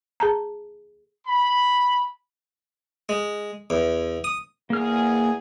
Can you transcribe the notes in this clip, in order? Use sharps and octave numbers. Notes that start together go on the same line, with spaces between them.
G#4 A5 A#5
B5
G#3
E2
D#6
E2 A#3 G#4 F6